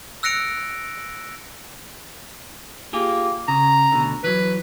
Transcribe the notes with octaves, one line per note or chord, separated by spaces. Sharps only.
E6 F#6 A#6 C#7 D7 F7
A#3 F4 G4 G#4
C#3 A#5
D2 B2 D3
E3 F#3 B4